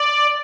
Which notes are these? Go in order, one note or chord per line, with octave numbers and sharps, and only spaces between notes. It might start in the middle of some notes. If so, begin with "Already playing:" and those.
Already playing: D5